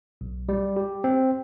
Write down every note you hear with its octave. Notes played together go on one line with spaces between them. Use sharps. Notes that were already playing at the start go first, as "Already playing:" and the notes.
B1
G3
G4
C4